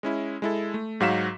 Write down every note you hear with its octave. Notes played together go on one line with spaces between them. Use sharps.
G#3 C#4 E4
G#3 E4 A4
A3
G#2 F#3 F#4 F5 B6 E7